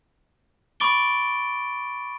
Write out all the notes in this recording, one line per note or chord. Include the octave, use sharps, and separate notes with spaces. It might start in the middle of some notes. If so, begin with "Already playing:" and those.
B5 C#6 D6 A6 D7 G7